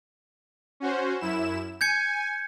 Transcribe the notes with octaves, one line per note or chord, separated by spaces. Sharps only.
C#4 F#4 C5
F#2 E4 E7
G#5 G6 G#6 C#7